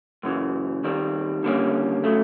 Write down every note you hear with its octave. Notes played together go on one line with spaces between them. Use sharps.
F#2 C#3 E3
D#2 D#3 G3 C4
D#2 D3 G3 A#3 C#4
C#3 F#3 A3